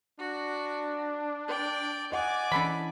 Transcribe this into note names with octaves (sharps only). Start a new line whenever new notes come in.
D4 F#4
D5 G5
D5 D#5 F#5 G#5 D6
E3 C#4 D4 A4 B5